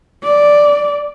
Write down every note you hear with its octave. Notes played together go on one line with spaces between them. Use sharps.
D5